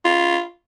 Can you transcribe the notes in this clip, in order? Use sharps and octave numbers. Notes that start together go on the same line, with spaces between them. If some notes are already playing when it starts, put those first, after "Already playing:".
F4